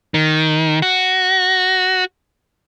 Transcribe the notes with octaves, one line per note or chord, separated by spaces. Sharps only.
D#3
F#4